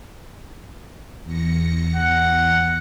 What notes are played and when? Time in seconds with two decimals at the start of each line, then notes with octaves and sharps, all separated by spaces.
1.24 E2 A#6 C#7
1.96 F#5